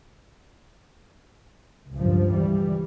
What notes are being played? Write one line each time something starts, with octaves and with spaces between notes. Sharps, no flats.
C#2 G2 F3
E3 G3